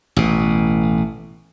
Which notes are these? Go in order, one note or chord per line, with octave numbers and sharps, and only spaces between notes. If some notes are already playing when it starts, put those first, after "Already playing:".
A1 B2